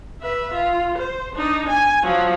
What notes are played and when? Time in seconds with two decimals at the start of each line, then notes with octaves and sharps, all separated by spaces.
0.22 B4 E5
0.54 F4
0.98 C5
1.35 D4 D#4
1.69 G#5
2.03 F3 F#3